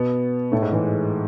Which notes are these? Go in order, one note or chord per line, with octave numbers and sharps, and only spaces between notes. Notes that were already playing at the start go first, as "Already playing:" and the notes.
Already playing: B2 B3
A2 A3
G#2 G#3
E3